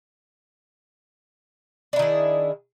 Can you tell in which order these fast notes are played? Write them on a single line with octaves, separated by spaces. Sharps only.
D4 E4 D#3 G#4